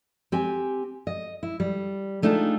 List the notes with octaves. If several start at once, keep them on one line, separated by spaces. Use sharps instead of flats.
C4 G4 G#5
D#5
E4
G3
G3 A3 D4 D#4 F4 G#4